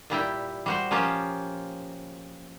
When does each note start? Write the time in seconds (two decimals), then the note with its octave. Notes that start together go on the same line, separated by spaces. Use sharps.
0.10 A#2 G3 E4 G5
0.66 G3 F#4 C5
0.91 F3 A#3 C#4 F4 G4